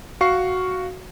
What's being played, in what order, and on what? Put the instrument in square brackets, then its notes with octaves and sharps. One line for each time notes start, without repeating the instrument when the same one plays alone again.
[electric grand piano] F#4 F5 C#6 C7